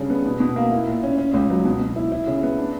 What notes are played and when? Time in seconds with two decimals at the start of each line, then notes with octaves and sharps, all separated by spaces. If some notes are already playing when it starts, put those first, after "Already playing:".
Already playing: C#3 G3 D4
0.10 B3
0.26 B2
0.40 B2
0.56 A#3
0.71 E4
0.87 A#2
1.03 C#4
1.18 C#4
1.33 C#2
1.50 F#3
1.65 B2
1.81 B2
1.96 E4
2.12 E4
2.27 C#3
2.43 B3
2.58 D4